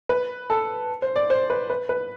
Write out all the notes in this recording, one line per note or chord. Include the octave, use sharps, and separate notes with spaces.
B4
A4
C5
D5
C5
B4
B4
B4